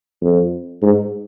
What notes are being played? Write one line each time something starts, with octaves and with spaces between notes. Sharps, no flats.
F2
G#2